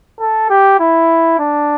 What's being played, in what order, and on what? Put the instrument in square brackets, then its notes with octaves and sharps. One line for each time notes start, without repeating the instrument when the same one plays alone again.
[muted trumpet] A4
G4
E4
D4